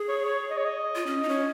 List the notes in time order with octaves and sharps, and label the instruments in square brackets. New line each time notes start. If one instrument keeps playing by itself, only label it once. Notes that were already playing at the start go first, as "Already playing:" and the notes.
Already playing: [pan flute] G#4
[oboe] C#5
C#5
D#5
C#5
D#5
[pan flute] F4
C#4
D#4
[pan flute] C#4 [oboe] C#5